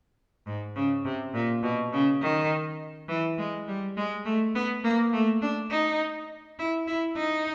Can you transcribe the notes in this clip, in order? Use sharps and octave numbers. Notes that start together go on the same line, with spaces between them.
G#2
C#3
C3
A#2
B2
C#3
D#3
E3
G#3
G3
G#3
A3
B3
A#3
A3
D4
D#4
E4
E4
D#4